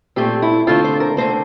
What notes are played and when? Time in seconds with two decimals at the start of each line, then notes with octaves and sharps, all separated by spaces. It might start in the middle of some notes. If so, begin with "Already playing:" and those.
0.16 A#2 A3 C4 G4
0.42 E4
0.67 D3 A3 C4 F4
0.84 C5
1.00 A#4
1.17 D3 A3 C4 C5